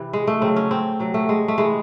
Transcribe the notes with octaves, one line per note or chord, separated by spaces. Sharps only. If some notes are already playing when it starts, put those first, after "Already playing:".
Already playing: C3 E3
G#3
A3
C#3 F#3 C4
C#4
C4
C3 F#3
A3
G#3
A3
C3 E3 G#3